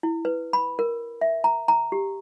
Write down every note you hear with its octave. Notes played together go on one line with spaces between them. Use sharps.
E4
B4
B5
A#4
E5
A#5
A#5
G4